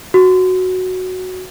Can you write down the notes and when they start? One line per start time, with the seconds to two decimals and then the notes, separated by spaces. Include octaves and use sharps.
0.14 F#4